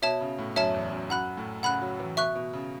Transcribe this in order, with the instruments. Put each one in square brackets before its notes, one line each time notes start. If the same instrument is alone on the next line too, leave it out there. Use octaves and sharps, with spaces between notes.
[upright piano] B2 [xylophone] C#5 E5 A5
[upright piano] C#3
A2
[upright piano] F#2 [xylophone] C#5 E5 A5
[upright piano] E2
F#2
[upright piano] F#2 [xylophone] F#5 B5 F#6
[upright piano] A2
[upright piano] C#3 [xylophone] F#5 B5 F#6
[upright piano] F#3
E3
[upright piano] B2 [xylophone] E5 C#6 F#6
[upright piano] B2
C#3